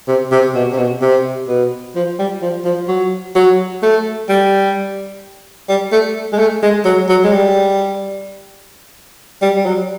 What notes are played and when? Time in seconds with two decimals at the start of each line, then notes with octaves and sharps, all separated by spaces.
0.08 C3
0.32 C3
0.55 B2
0.72 C3
0.78 B2
1.02 C3
1.48 B2
1.96 F3
2.19 G3
2.42 F3
2.65 F3
2.88 F#3
3.35 F#3
3.82 A3
4.29 G3
5.69 G3
5.92 A3
6.33 G#3
6.38 A3
6.62 G#3
6.85 F#3
7.09 F#3
7.24 G#3
7.33 G3
9.42 G3
9.56 G3
9.66 F#3